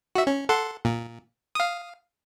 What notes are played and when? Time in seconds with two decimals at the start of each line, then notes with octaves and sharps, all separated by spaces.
0.15 F#4 E5
0.27 C#4
0.49 A4 F#5 C6
0.85 A#2
1.55 F5 D#6